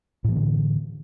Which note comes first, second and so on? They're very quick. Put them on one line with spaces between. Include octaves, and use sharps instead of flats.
A2 E3 A#3 D3